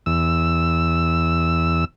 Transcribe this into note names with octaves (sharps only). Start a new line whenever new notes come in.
E2 E6